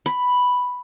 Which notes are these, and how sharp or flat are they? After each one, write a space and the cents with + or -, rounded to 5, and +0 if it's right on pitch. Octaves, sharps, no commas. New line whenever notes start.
B5 +0